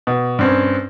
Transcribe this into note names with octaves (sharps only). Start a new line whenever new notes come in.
B2
G2 C4 C#4